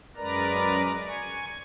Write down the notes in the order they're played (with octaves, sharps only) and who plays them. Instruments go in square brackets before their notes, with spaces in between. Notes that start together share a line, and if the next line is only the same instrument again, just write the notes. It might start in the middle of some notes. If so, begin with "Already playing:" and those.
[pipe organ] F#2 G#3 A#4 B4 D5 A#5
G#5 C#6